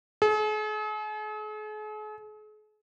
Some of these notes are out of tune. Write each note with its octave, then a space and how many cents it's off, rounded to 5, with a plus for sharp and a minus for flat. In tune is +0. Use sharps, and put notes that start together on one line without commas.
G#4 +45